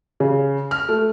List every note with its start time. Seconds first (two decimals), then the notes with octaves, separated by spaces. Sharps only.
0.20 C#3
0.71 F6
0.89 A3